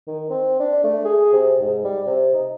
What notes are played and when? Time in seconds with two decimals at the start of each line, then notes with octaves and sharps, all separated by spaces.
0.07 D#3
0.30 C4
0.60 D4
0.84 A3
1.05 G#4
1.33 C3
1.61 G#2
1.84 G3
2.06 C3
2.34 D#4